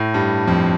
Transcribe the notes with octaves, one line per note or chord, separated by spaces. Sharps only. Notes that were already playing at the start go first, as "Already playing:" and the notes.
Already playing: A2
G2
F2